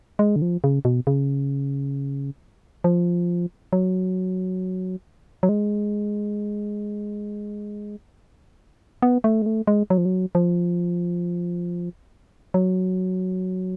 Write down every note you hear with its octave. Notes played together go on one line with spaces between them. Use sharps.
G#3
D3
F3
C#3
B2
C#3
F3
F#3
F#3
G#3
B3
A3
G#3
A3
G#3
F#3
F3
F#3
F3
F#3